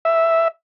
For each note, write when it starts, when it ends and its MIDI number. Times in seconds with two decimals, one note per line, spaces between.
0.05 0.48 76